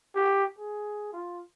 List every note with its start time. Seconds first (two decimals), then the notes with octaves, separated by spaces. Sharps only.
0.15 G4
0.58 G#4
1.13 F4